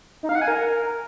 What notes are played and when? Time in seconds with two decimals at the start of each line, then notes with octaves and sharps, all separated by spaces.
0.23 D#4
0.29 F5
0.35 F#5
0.41 G#5
0.48 A#4